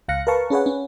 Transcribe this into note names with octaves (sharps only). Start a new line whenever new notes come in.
C#2 F5 F#6 A#6 C#7
A#4 B4 F5 A5 C#6
C#4 G#4 B4 C#5 F#5
C#4